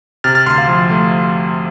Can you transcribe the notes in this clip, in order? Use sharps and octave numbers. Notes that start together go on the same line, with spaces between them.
C3 F6 A6
F6 A6
D2 C6 F6
F5
F3
A3